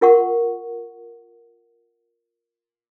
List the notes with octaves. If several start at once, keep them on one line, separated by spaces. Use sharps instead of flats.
F4 A#4 F#5 C#6